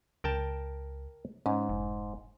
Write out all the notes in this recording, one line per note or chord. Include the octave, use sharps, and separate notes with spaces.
C#2 A#4 G5 A5
G#2 C#4
F1